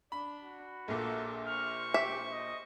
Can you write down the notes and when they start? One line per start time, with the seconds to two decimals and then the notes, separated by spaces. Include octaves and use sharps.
0.12 D4 B5
0.41 F#4
0.88 A#1 A#2 A#3 A4
1.47 C5 C#6 F6
1.94 G4 E5
2.32 D#5